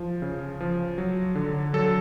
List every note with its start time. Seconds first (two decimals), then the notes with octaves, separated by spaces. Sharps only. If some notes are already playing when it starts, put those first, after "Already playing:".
Already playing: F3
0.22 C#3
0.60 F3
0.98 F#3
1.35 D3
1.73 F#3 A4